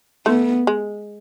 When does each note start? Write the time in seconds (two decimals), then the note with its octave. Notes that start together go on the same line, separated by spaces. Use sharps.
0.26 A3 B3
0.67 G#3